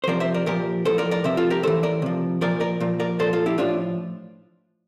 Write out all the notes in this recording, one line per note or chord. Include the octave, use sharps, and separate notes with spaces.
C5
C3 F3 A#4 D5
C5 E5
A#4 D5
A#2 F3 G4 A#4
A2 F3 A4 C5
A#4 D5
A#4 D5
C3 F3 C5 E5
F4 A4
G4 A#4
A2 E3 A4 C5
A#4 D5
C3 F3
A#2 F3 A#4 D5
A#4 D5
A#2 F3
A#4 D5
A#2 F3 A4 C5
F4 A4
E4 G4
A2 F3 D4 F4